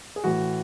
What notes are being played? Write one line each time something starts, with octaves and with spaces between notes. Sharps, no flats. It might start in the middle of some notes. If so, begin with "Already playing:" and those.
G#4
A2 E3 F#4